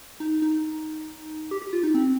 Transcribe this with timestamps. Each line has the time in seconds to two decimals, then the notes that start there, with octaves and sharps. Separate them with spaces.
0.20 D#4
0.42 D#4
1.51 G4
1.62 G4
1.73 F4
1.83 D#4
1.94 C4